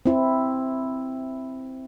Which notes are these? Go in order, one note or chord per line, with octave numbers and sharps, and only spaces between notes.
C4 E4